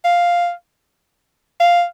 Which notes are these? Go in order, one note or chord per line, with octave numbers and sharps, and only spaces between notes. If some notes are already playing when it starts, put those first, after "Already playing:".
F5
F5